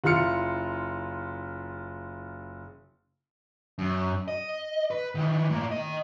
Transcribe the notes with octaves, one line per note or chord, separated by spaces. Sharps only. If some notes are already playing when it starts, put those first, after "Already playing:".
F#1 E4 F4 C6 F6 C#7
F#2
D#5
B4
D#3 E3
A2 A#3
A#4 D#5